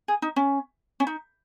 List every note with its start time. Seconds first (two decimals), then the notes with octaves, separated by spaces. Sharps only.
0.08 G#4
0.22 D#4
0.36 C#4
1.00 C#4
1.07 D#4